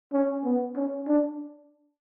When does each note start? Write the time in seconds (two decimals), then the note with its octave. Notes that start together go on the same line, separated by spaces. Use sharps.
0.13 C#4
0.44 B3
0.76 C#4
1.07 D4